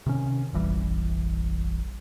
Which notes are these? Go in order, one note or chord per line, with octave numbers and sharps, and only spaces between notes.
C3 D#3 C#4
F1 A#1 E3 G3